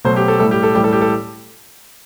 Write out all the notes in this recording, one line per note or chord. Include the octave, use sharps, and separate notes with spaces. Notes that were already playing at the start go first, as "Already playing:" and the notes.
B2 F#3 A3 C5
G4
A4
A2 G3 A4
G4
A4
A2 E3 G3 G4
A4
G4
A4